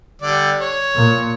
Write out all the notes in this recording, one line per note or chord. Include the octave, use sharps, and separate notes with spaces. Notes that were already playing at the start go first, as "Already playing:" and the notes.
D3 G3 D5
C#5
A#2